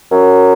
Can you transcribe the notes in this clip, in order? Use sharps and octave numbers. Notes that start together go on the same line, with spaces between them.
F#2